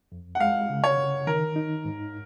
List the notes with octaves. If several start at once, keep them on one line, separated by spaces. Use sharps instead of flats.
F2
F#5
G#3 F5
C#3
C#5
C#3
D#3 A#4
D#4
G#2